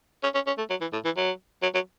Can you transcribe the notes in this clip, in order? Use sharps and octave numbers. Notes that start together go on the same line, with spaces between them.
C#4
C#4
C#4
A3
F#3
E3
A2
E3
F#3
F#3
F#3